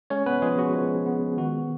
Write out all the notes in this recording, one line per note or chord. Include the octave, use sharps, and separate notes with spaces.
G#3 C#4 C#5
B3 B4
F3 G#3 G#4
F#4
F3
B3
D#3 F#4